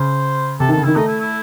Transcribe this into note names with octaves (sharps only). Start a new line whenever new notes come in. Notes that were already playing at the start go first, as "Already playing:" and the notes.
Already playing: C#3 C5
C3 A4
D#3
A4
C#3
D#3 E4
A3 D#4
E4
E4